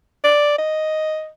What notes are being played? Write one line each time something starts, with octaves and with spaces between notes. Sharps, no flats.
D5
D#5